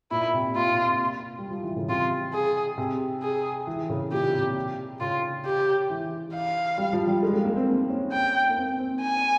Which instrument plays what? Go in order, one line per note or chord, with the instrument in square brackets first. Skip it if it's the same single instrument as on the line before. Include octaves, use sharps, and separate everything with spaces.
[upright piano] A#2 [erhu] E4
[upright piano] C3
[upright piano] A#2 [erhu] F4
[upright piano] A#2
C3
G3
F3
E3
C#3
[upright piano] C3 [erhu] F4
[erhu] G#4
[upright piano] C3
[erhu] G#4
[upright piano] E3
C#3
[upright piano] A#2 [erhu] G4
[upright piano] C3
[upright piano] C#3 [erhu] F4
[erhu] G4
[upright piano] E3
[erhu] F5
[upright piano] G3
F3
G3
G#3
G#3
A#3
C4
A#3
C#4
[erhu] G5
[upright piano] A#3
C4
C4
[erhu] G#5